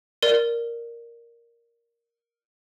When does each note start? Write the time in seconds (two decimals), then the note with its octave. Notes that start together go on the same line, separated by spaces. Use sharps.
0.23 A#4 D5